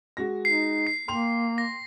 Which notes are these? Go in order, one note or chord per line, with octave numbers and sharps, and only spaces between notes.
G#3 F#4 A#6
D#4 C7
C7
A#3 G5 C6 F7
A#6